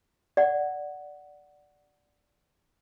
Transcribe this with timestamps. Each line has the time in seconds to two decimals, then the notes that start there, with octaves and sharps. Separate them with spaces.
0.37 D5 F#5